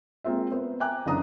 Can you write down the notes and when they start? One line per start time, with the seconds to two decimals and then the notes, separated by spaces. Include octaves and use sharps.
0.24 G#3 A#3 C4 F4 E5
0.52 B3 C5
0.80 E5 G5 G#5 A#5 D6 F#6
1.06 F#1 C#3 E3 D4 A#5 D#6